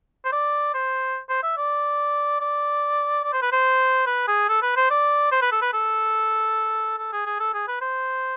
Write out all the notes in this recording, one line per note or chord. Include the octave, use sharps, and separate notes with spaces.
C5
D5
C5
C5
E5
D5
D5
D5
C5
B4
C5
B4
G#4
A4
B4
C5
D5
C5
B4
A4
B4
A4
A4
G#4
G#4
A4
G#4
B4
C5